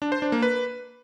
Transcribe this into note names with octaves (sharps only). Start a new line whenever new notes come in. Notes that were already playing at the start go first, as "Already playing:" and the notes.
D4
C5
D4
A#3
B4